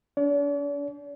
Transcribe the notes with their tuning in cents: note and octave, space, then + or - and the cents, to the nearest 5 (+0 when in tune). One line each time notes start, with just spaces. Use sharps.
D4 -45 D5 -45